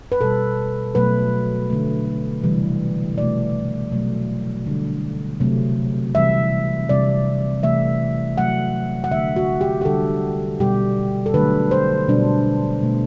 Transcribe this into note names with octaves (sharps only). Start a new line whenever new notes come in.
B4
B2 G3 A4
B2 F#3 A3 B4
D3 A3
C3 E3 G3
B2 A3 D5
B2 F#3 A3
D3 G3
C3 F#3 A3
C3 E3 G3 E5
C3 G3 D5
C3 E3 A3 E5
C3 F#3 A3 F#5
F#5
D3 A3 E5
F#4
G4
G4
D3 G3 A4
B2 G3 G4
A4
D3 F#3 A3 B4
C5
B2 G3 D4
B2 A3